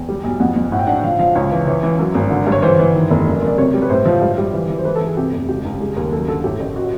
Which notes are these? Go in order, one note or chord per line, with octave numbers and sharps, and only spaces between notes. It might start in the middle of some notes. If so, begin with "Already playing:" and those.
Already playing: E2 G5
G3
B1
F2 F#5
F2
A2 F#5
G5
D4 F#5
F3 F5
F3 F5
C#2 C#5
E3
E3 C#5
E3
F#2
G#1
D3
G2
C#5
E3 C5
E3
D#3
F1
F#1
F#1 D5
C3 C#5
G3
B4
A2 C5
F3
G2
G3
E3
E3
C5
E3 B4
A4
E3
G#4
C3 G4
F1
C#2 G4
C#2
G3 G#4
D#2
F#2 A4
D3 A4
A2 G4
A1
F#4